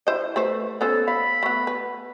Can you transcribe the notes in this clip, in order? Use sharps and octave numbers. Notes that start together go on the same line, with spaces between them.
E4 C5 D#5
A3 B4 C5
B3 C#4 A4 C5
F5 B5
A3 B3
B4